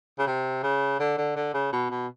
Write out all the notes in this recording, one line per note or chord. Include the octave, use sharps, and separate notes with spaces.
C#3
C3
C#3
D3
D3
D3
C#3
B2
B2